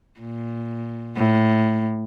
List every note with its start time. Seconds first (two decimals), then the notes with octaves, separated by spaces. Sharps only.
0.20 A#2
1.17 A2